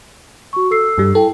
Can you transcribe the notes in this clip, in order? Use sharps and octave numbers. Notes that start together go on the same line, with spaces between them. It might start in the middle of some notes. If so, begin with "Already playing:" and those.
F#4 C#6
A4 E6 C7
G2 G3
E4 A4 G5